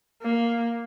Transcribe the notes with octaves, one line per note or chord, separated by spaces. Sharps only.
A#3